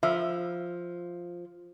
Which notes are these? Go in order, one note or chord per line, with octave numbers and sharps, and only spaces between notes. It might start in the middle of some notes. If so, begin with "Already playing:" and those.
F3 E5